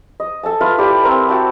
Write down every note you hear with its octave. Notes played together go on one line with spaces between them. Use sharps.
D#5
A4 G#5 A5
F4 B4 E5 F5
E4 G4 D5
C4 A#4 C5 A#5
F#4 G5 A5